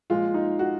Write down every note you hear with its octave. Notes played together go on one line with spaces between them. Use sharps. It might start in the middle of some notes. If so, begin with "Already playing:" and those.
A#2 F3 G#3 F4
D#4
F#4